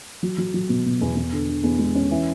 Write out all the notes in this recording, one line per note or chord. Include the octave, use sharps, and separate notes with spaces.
F#3
F#3
F#3
B2
B2
E2
E2
D3
D3
E2
G#3
C#4
E3